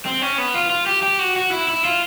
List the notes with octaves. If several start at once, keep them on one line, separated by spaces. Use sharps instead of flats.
C4
C#4
B3
F4
F4
G4
G4
F#4
F#4
E4
E4
F4